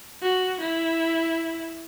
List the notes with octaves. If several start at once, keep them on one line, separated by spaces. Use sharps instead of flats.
F#4
E4